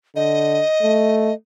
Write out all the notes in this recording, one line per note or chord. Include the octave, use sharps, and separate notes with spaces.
D3 D#5
A3